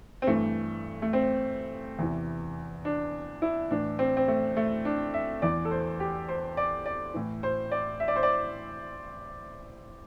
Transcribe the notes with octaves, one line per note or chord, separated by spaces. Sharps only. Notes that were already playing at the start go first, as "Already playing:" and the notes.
C4
G2 E3 A3
A3
C4
E2 C3 E3
D4
E4
A2 E3 D4
C4
C4
A3
A3
D4
E5
E2 E3 D5
A4
C5
G4
C5
D5
D5
A2 E3
C5
D5
E5
D5
C5
D5